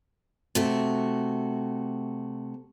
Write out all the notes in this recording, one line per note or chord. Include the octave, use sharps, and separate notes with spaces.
C3 A3 F#4